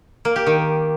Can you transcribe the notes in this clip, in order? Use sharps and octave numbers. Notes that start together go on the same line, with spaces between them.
A#3
G4
D#3